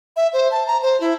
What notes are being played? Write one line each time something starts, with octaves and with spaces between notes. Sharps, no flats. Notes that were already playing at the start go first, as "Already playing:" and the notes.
E5
C5
A5
A#5
C5
E4